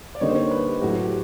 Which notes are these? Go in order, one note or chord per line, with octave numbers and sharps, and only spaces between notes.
D5
D3 G3 A#3 D#4 C#5
C5
C#5
B4
G4
A2 F#3 A3 F#4
G4